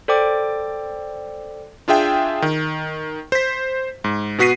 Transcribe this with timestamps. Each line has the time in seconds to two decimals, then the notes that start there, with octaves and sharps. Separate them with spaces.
0.08 A4 C5 D5 G5 D6
1.88 D4 F4 G#4 E5 G5
2.42 D#3
3.32 C5 B6
4.04 G#2
4.38 B2 B3 F#4 B6 C7 D#7